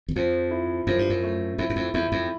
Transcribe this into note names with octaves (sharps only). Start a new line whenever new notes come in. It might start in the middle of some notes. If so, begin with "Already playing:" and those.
E2
F2 F3
E4
F#2 F3
G2
F#2
A3
F2 E4
F#2
F2
E2 E4
F2